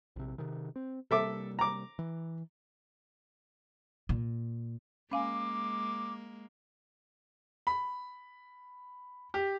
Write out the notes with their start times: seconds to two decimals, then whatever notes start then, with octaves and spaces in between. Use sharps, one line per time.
0.16 A#1 C3
0.38 C3 D#3
0.76 C4
1.11 C3 G3 A#3 A4 E5 D6
1.59 A#5 D6
1.99 E3
4.09 A#2
5.12 G#3 A#3 C#4 F5 G#5 D6
7.67 B5
9.34 G4